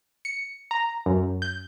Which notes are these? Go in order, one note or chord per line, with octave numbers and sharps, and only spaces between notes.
C#7
A#5
F#2
G6